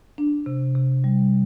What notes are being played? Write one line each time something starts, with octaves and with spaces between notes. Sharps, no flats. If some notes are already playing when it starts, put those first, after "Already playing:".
D4
C3
C3
G3